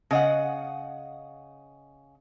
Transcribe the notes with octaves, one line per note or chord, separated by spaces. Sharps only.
C#3 D#5 F#5